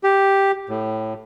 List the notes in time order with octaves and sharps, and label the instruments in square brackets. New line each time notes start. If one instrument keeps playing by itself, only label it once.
[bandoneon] G4
A2